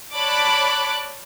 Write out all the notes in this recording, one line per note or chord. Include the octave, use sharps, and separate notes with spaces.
C#5 D5 A5 B5 D6 F#6